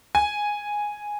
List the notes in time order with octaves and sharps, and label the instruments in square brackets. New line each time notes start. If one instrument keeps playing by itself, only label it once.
[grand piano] G#5